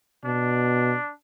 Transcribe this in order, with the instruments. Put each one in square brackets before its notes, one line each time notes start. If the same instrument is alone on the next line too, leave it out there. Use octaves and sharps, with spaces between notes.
[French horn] B2 [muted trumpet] D4